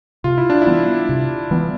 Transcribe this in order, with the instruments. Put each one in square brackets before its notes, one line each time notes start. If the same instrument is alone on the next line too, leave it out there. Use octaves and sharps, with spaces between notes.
[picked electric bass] C3 [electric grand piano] F4
[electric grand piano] E4
D4
E4
[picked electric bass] E3 G3 B3
C3
E3 G3 B3